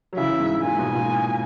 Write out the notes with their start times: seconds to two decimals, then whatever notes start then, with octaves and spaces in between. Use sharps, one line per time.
0.13 F#3
0.17 C#3 E3 E5
0.40 G#2
0.63 A#2 G#5
0.79 G#2 B2
0.95 A#2